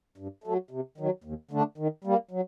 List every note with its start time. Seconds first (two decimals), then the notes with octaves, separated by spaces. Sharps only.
0.18 G2
0.44 F#3 A3
0.71 C3
0.98 D#3 F#3
1.24 D#2
1.51 D3 A3 D4
1.78 D#3
2.04 G3 A#3
2.31 F#3